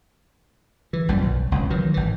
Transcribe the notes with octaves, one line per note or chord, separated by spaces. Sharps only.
E3
G#1 F#2 A#2 G3
B1
F#1 C#2 C3
D#3 E3 F#3
G#1 E3